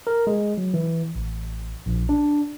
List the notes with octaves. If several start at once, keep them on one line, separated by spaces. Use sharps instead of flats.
A#4
G#3
F#3
E3
A1
A#1
D4